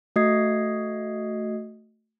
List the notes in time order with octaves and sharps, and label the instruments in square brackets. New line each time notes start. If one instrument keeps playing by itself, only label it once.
[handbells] A3 F#4 D#5 D#6 G#6 C7